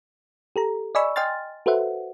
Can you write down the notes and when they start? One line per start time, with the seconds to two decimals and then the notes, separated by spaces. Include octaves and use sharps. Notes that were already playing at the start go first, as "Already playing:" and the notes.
0.56 G4 A4 A#5
0.95 D5 D#5 G#5 B5 C#6 E6
1.16 D#5 G5 G#5 C6 F6 A6
1.66 F#4 A4 B4 C5 E5 F#5